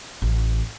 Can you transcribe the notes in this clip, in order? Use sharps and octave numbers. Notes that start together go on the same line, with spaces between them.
A1